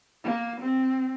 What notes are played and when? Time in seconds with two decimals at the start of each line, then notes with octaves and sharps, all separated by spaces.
0.24 A#3
0.60 C4